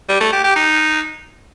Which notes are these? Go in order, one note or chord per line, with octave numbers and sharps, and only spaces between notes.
G3
A3
G4
G4
D#4